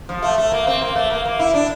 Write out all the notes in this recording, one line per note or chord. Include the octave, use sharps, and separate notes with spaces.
F3
A3
A3
A#3
C4
A#3
A3
A#3
A#3
E4
D4